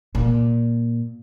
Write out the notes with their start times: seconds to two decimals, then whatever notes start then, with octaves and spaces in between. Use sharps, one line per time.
0.15 A#2